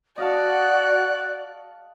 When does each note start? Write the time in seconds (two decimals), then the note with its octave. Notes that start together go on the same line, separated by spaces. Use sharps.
0.18 F#4 D5 D#5 F5 F#5 A5 F#6